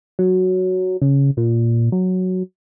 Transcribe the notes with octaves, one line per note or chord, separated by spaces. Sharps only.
F#3
C#3
A#2
F#3